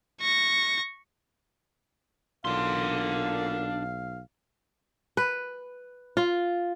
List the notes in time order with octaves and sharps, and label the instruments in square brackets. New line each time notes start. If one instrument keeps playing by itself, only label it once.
[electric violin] C#6 A#6
[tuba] B1 [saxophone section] A#2 D3 A#3 [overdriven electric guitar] D4 C6 [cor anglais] F5
[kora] B4
F4